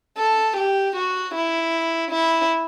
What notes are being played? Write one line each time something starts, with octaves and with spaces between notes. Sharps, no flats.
A4
G4
F#4
E4
E4